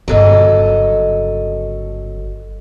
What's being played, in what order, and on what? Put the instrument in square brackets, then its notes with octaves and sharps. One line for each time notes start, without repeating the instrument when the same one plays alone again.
[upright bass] G1 C#3 [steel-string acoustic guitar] F#3 A4 D#5